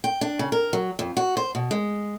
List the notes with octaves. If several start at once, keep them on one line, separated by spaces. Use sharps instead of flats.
G5
D4
C#3
A#4
F#3
F2
F#4
C5
B2
G#3